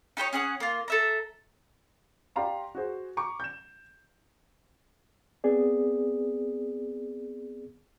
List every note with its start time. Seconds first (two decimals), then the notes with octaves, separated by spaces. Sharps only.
0.17 D#4 G4 C5 C#5
0.33 C#4 G#4 F#5 D#6
0.60 A#3 F4
0.88 A4 E5 A#5
2.36 G4 D5 F5 A#5 C6
2.75 F#4 G#4 C5
3.17 A#5 C#6 D6
3.40 G6 E7
5.44 B3 C4 G#4 D5